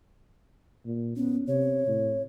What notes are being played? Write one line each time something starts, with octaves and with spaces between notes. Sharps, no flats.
A#2
B3 C#4
C3 C#5
A2